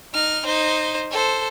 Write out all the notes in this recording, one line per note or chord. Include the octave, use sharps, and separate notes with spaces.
D#4 F6
D#4 C5
A4 C5